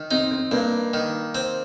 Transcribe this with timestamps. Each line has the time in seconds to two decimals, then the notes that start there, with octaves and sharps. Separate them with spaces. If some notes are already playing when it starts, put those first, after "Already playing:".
Already playing: D#3
0.11 C4 D#4
0.31 C4
0.51 G2 A#3
0.94 D#3
1.35 C4